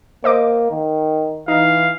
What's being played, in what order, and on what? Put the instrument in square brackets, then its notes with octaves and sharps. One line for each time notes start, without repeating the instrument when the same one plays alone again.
[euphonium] A#3 [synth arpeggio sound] C5 D#5 D6
[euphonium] D#3
[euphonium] E3 [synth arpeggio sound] D#4 [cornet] F5